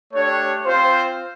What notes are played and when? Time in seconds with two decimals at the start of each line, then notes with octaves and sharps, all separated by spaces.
0.12 A3 D4 G4 C#5
0.64 C4 F4 C5